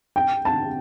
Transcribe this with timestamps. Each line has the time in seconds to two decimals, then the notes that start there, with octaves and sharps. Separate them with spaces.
0.16 G5
0.45 A5